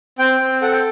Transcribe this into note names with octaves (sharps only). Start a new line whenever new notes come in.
C4 G5
C4
A4 F#5
G5